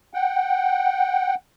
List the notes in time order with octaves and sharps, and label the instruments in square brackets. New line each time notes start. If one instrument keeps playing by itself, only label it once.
[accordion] F#5 G5